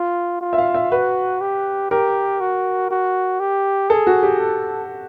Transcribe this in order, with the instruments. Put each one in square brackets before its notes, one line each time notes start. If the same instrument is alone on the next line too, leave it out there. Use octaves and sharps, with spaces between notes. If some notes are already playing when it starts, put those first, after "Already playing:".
Already playing: [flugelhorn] F4
F4
[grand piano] E5
F5
E5
[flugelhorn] F#4 [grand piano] B4
[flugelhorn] G4
[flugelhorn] G4 [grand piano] A#4
[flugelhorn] F#4
F#4
G4
[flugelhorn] G#4 [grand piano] A4
[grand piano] F#4
G4
[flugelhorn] A4